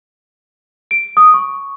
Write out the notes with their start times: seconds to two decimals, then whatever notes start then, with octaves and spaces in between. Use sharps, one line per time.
0.91 D7
1.17 D#6
1.34 C#6